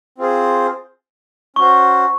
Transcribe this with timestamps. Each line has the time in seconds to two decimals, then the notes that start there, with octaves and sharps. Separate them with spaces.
0.18 C4 F4 G#4 C5
1.56 C#4 F#4 C5 C#6